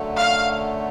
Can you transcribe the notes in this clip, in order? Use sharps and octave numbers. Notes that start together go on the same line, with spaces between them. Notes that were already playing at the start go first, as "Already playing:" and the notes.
Already playing: F#2 D3 F#3 A3
F5